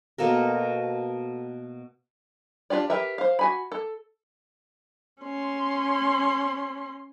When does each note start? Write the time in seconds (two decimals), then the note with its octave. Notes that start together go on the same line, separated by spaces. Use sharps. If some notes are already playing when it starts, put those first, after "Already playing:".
0.18 B2 A#3 A4 A#4
2.70 D4 F4 G4 D5
2.90 G4 A#4 B4 E5
3.18 C5 F5
3.39 F#4 G#5 B5
3.72 A4
5.22 C#4 C6